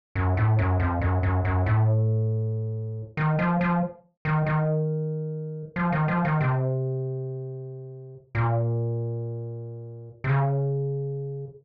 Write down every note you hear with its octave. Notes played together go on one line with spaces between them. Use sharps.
F#2
A2
F#2
F2
F#2
F#2
F#2
A2
D#3
F3
F3
D#3
D#3
F3
D#3
F3
D#3
C3
A#2
C3
C#3